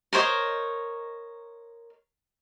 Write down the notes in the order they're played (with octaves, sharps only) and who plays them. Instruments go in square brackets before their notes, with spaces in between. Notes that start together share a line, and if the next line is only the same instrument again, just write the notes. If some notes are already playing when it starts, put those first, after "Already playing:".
[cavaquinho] A#4 C5 C#5 D#5